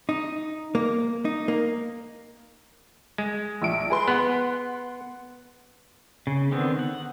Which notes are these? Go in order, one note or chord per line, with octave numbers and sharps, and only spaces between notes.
D#4
A#3
D#4
A#3
G#3
A#1 E5 D7
G#4 B4 C6
B3 F#5 C6 F#6
C#3
D3 D#3 B3 C4
F#5